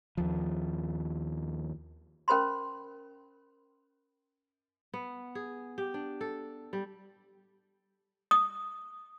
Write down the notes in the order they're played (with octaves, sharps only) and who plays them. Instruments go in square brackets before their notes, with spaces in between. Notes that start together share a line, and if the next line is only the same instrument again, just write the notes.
[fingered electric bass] D#2 F3
[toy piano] C#4 A#4 C5 B5 C6
[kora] B3
G#4
G4
D4
A4
G3
[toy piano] D#6